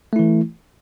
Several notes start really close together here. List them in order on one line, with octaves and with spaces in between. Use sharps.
A3 E4 E3